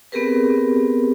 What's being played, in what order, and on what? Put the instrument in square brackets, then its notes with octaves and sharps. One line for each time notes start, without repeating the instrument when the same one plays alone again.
[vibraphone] B3 C4 G4 G#4 A#4 B4